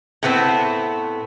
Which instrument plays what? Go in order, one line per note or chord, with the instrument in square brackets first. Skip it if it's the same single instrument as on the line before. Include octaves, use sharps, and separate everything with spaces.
[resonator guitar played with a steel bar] A2 A3 B3 C4 B4